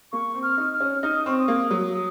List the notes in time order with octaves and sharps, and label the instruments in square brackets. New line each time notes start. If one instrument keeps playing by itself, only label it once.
[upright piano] A#3 [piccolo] C#6
[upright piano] C4
[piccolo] F6
[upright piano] D#4
[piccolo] F6
[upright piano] C#4
[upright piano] D#4 [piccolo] F6
[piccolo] D#6
[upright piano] C4 [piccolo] C#6
[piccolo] D#6
[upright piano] A#3
F#3
[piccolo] D#6